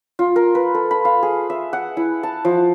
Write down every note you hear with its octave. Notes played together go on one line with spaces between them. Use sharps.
F4
A#4
B4
A4
B5
F5
G#4
E5
F#5
E4
A5
F3